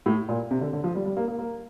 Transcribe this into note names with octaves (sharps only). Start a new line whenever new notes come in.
A2
A#2
C3
D3
D3
F3
G3
G3
A#3
A#3
A#3